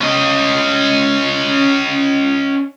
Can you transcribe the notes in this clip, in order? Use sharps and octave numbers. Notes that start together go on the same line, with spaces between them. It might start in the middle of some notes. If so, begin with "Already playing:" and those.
C#4 D#5